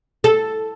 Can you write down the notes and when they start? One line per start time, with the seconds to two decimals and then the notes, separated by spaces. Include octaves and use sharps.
0.24 A4